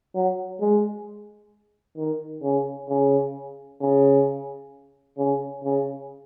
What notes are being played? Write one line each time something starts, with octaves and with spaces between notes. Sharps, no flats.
F#3
G#3
D#3
C#3
C#3
C#3
C#3
C#3